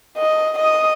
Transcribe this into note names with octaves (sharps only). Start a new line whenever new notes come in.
D#5
D#5 D#6